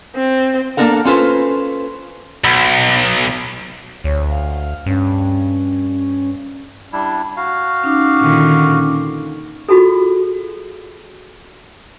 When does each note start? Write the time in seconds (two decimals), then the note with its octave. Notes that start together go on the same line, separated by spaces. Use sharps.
0.15 C4
0.77 A#3 C#4 D4 A4 A#4 F#5
1.05 C#4 F4 A4 B4 C5
2.44 B1
4.04 D2 C#5
4.30 F5
4.86 G2 C#4
6.93 G3 D4 E4
7.37 F#4 F5
7.84 C#4 D#4 D6
8.20 A#2 D3 D#3
8.66 A#2
9.69 F4 F#4 G#4 A4